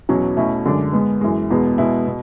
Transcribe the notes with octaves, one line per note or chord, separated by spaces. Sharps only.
E2 B2 F#3 C#4
B2 A3 C#4 E4
F#2 D3 G#3 D4
G#2 G#3 B3
F#2 E3 G#3
E2 B2 G#3 B3
B2 G#3 B3 E4
B2